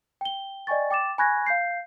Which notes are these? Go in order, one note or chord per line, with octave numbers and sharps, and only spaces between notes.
G5 G7
D5 D#5 G5 G#5 C#6 A6
G5 D6 A6 E7
G#5 B5 C#6 F#6 G#6 A#6
F5 G6 C7